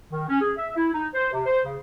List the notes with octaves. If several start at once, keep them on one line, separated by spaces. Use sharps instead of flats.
D#3
C#4
G#4
E5
E4
D#4
C5
C3
C5
C#3